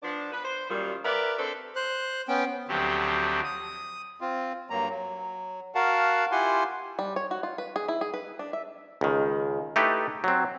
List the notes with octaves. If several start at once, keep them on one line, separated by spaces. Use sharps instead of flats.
F3 B3 D4
B4
C5
F#2 A#2 D#3 G3 F4
G4 A#4 B4 D5 E5
C4 D4 A4 B4 C5
C5 F#6
B3 C#4 G5
D2 F3 F#3 C4 G4
D#6
C4 F4
G2 F#3 A#3 A#5
F#3
F#4 A#4 F5 F#5 A5
E4 F4 G4 F#5 G#5 C6
G3
C#5
F#4
F4
B4
G#4
E4
G#4
B4
D4
E5
C#2 D#3
A3 D#4 E4 G4 A4 B4
F#3 C4